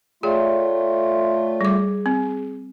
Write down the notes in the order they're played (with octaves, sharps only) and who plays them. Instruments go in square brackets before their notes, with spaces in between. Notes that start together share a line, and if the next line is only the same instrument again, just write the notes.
[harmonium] A3 F4 [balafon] G#4 [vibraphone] C#5 D5 G5
[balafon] G3 D6 [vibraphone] G#4
[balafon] C4